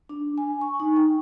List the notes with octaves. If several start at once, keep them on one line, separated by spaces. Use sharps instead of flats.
D4
G#5
C#6
D#4
G5